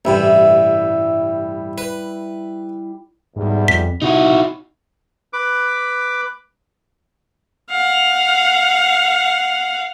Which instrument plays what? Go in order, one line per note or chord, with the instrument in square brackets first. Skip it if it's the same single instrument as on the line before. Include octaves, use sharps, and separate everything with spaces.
[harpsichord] A1 G2 C3 [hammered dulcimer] G3 E4
[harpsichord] B4
[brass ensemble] B1 E2 G3 [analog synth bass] G#2
[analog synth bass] F2 [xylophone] B6
[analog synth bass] C3 [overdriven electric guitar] D#4 F#4 [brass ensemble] E4
[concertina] B4 D6
[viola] F5 F#5